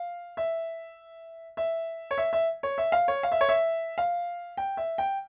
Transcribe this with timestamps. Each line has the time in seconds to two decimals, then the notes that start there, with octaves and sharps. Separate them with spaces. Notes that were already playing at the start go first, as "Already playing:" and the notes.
Already playing: F5
0.37 E5
1.57 E5
2.11 C#5
2.18 E5
2.33 E5
2.63 C#5
2.78 E5
2.92 F5
3.08 C#5
3.23 F5
3.32 E5
3.41 C#5
3.49 E5
3.98 F5
4.57 G5
4.77 E5
4.98 G5